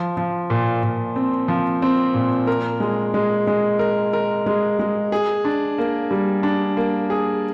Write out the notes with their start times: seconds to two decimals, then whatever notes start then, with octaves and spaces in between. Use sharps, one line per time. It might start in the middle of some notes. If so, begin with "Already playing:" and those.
Already playing: F3
0.17 F3
0.50 A#2
0.83 A#2
1.16 C4
1.48 F3
1.82 C4
2.14 A#2
2.47 A#4
2.80 G#3
3.14 G#3
3.47 G#3
3.79 A#4
4.13 A#4
4.46 G#3
4.79 G#3
5.12 G#4
5.45 D4
5.78 A#3
6.11 G3
6.43 D4
6.77 A#3
7.10 G#4